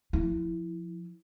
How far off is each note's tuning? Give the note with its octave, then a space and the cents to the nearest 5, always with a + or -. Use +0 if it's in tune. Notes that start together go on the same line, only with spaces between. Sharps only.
F3 +5 E4 +0